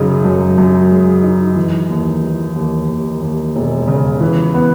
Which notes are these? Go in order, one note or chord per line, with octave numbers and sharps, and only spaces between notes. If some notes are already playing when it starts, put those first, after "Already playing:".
Already playing: F#2 C#3 D#4
F#2
F#2
G#3
D#4
E3
D#2
E3
D#2
D#2
D#2
E1
C#3
E3
B3